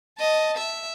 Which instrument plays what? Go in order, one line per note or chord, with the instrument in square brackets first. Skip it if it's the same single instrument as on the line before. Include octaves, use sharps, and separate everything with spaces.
[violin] D#5 A5
E5